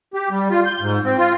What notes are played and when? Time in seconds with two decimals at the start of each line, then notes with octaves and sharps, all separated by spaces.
0.14 G4
0.30 G3
0.50 F4
0.65 G6
0.80 G#2
1.04 C4
1.18 F4